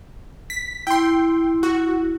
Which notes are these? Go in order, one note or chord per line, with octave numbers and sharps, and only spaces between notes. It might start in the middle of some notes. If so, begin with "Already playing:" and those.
B6
E4 G5 C6
F#4